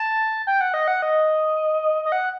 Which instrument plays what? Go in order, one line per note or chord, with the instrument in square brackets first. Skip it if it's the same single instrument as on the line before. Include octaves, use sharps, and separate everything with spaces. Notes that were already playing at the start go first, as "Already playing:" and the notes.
Already playing: [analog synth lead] A5
G5
F#5
D#5
F#5
D#5
D#5
F#5